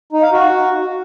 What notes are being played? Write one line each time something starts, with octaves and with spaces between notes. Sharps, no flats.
D#4
F5
F#4